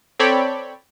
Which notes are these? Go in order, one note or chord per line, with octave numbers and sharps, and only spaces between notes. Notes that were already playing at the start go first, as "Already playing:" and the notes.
C4 A4 C#5 D5 G5 B5